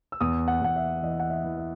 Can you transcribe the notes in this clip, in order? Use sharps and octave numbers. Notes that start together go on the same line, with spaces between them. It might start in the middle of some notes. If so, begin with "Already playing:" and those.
E6
E2 D#6
F#5
E2 F#5
E5
E3 D#5
F#5
E5
E3
E5